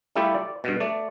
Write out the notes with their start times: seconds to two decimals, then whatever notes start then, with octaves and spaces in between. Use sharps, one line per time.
0.16 G3 A3 E4 F4 G4 A4
0.35 D5
0.64 G2 B2
0.80 A3 D5